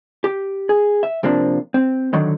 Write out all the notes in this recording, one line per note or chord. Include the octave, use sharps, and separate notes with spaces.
G4
G#4
E5
C3 F3 A#3 C4 D4
C4
D3 D#3 F#3